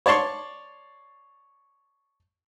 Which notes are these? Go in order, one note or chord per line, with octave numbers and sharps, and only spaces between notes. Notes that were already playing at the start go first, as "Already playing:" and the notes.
C#5 D5 A5 C6 C#6